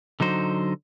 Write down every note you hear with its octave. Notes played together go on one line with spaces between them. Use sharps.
D3 F#3 D#4 C5